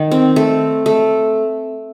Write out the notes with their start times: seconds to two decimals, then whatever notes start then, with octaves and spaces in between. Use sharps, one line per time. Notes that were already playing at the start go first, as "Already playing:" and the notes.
Already playing: D#3
0.11 C4
0.36 A3
0.86 A3